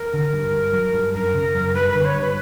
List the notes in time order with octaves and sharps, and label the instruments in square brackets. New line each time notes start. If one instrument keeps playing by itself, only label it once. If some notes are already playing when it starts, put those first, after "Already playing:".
Already playing: [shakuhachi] A#4
[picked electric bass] D3
G2
G2
F#3
G2
[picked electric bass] F#2 [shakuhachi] A#4
[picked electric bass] C#3
F#2
[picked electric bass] G2 [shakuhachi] B4
[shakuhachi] B4
[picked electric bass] D3
[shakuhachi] C#5
[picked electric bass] G2
[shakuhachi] B4